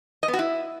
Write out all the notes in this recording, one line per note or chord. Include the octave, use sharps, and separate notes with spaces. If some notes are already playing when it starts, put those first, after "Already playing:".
D#5
B3
F#4
E4